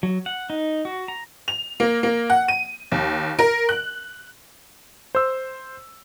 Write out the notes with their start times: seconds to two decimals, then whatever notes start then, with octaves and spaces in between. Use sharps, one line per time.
0.03 F#3
0.26 F#5
0.50 D#4
0.85 F#4
1.08 A#5
1.48 F7
1.80 A#3
2.03 A#3
2.30 F#5
2.48 D#7
2.92 D#2
3.39 A#4
3.69 F#6
5.15 C5 E6